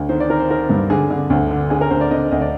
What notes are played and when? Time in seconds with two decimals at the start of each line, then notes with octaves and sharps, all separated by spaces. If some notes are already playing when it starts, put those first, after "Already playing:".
Already playing: D2
0.09 D#3 C5
0.20 D5
0.30 D#3 A#4
0.39 C5
0.50 D#3 A#4
0.69 G2
0.90 D3 G#4
1.10 D3
1.30 D2
1.51 D3
1.70 D3 G#4
1.81 A#4
1.90 D2 C5
2.01 D5
2.11 D3 D#5
2.31 D2 D#5
2.41 D5